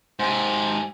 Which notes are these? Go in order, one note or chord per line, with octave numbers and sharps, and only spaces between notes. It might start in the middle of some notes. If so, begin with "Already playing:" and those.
G#2 G4 C5 G#5